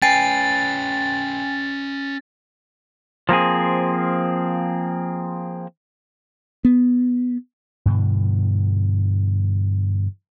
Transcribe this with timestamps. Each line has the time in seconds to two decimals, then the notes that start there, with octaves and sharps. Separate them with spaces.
0.02 C#4 B4 G5 G#5 A6 C7
3.29 F3 A#3 C4 G#4
6.65 B3
7.86 G2 B2 D3 E3